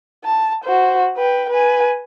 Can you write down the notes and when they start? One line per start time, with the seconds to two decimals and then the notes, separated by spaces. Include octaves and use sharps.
0.24 A5
0.64 F#4 C5
1.17 B4 G5
1.50 B4 G#5